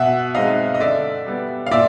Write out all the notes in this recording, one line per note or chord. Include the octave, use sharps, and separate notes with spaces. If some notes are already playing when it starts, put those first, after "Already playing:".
Already playing: B2 E5 F#5
G#3 C4 D#4 D#5 F5
D#5
D3 D5 E5
G3 B3
F5
A#2 D5 E5